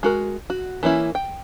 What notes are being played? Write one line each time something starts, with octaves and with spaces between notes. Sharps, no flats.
G#3 F#4 A#4
F#4
E3 A#3 C#4 E4
G5